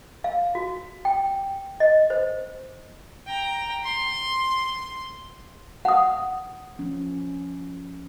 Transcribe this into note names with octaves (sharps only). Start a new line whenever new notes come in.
F5
F#4
G5
D#5
C5
G5 A#5
C6
F#5 D#6
F3 C#4